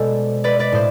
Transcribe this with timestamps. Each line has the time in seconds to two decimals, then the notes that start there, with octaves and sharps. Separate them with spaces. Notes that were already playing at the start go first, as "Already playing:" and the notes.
Already playing: B2 G#3 B3 A4 C5 D5
0.44 B4 D5
0.59 B4 D5
0.72 A2 C5